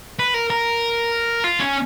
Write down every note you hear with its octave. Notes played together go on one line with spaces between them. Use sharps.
B4
A#4
A#4
F4
C#4